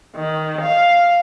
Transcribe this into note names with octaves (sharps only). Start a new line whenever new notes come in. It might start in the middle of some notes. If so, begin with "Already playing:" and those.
D#3
F5